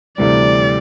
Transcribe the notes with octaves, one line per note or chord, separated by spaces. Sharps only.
D2 C3 E3 G3 D5